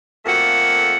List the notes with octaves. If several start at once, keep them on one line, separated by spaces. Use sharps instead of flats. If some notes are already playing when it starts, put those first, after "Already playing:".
F2 A3 A#3 F#5